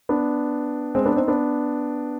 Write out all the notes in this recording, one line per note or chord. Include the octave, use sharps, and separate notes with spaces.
B3 D4
G#3 C4
B3 D4
C4 D#4
B3 D4